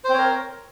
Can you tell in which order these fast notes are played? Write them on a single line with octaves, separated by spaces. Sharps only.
C5 C4 C#5 A#4